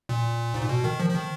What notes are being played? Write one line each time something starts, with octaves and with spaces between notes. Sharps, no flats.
A#2
G#2
A#2
B2
D#3
F3
F3
D#3